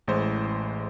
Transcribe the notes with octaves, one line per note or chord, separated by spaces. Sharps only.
A1 A2 G#3 C5